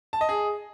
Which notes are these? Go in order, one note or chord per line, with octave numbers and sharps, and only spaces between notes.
A5
D#5
G#4